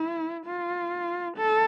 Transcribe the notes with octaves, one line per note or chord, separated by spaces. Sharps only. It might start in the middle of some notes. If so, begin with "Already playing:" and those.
Already playing: E4
F4
A4